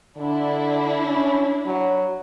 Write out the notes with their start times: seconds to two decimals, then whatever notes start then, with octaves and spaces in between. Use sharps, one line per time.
0.17 D3 D4 E4
1.05 C#4
1.66 F#3